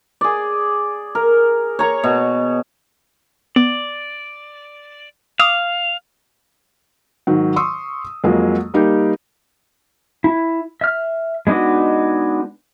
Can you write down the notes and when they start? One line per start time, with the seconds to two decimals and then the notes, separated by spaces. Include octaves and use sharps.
0.21 G#4 D5
1.15 A#4
1.79 C#5 A#5 C#6
2.04 B2
3.56 B3 D5
5.40 F5 D6 D#6
7.27 G#2 D#3 F#3
7.56 C6 C#6 D#6 E6
8.24 F2 F#3 G#3 A#3
8.74 G3 A#3 D#4 G4
10.24 E4
10.81 E5 F6
11.47 G#3 B3 D4 D#4 F#4